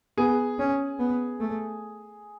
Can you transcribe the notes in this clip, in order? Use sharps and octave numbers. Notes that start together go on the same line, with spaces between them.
B3 G#4
C#4
B3
A3